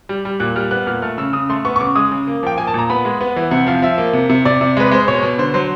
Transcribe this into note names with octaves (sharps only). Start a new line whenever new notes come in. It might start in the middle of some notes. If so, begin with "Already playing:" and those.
G3
G3
A#2 F#6
G3 F6
B3 F#6
A#2 F6
A3 F6
C#3 E6
C#3 D#6
A3 C6
B3 C#6
C#6
C#3 D6
G#3 D#6
C#3
A#3
F3 G5
A#3 G#5
A5
A#2 A#5
B3 B5
G#3
B3
E3
C3 F#5
F3 F5
F3 E5
A#3
C3
C3
C3 D5
C3
G#3 B4
G#3 C5
B2 C#5
B2
D3 C5
F#3 C5